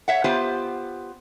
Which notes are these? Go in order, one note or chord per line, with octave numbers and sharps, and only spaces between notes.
C#5 E5 F#5
B3 F4 G4 C5